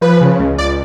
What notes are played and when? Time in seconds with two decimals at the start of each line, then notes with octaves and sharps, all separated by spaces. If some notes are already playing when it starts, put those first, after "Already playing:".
0.01 F3 B4
0.21 C#3
0.39 C#2
0.58 C#2 D5